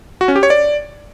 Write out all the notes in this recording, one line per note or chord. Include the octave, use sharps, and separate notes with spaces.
F#4
C#4
G4
C#5
D5